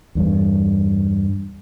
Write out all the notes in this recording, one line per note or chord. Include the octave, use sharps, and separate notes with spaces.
E2 G2